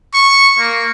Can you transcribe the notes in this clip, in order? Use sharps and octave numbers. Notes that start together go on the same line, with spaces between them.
C#6
A#3